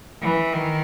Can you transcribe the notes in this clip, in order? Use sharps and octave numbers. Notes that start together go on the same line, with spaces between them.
E3
D#3